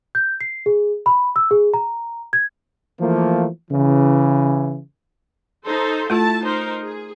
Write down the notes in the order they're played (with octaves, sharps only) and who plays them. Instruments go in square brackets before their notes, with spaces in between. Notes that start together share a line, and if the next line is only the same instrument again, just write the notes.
[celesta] G6
C7
G#4
B5
E6
G#4
A#5
G#6
[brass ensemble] E3 F3 A3 A#3
C#3 E3
[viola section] D#4 A4 C5
[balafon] A3 F4 A4 [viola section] E4 A5
[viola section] D#4 A#4 C5
G#4